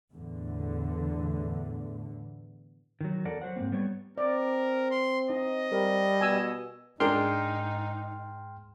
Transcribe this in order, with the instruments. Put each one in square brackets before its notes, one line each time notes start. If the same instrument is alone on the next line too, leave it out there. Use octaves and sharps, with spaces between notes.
[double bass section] E2 A2 D3
[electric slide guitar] D#3 F#3
E2 A4 A#4 D5 F#5
F#3 C5 F#5
G#2 B2 A#3 C4
G3 B3 C#5
[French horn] C4 [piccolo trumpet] A#4 [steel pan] D5
[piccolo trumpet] C6
[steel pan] D#4 [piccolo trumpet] D#5
[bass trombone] G3 [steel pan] A#4
[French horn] B2 [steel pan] G#5 E6
[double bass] G#2 [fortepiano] G#3 D4 A#4 [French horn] D#4 [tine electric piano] G5 C6 F6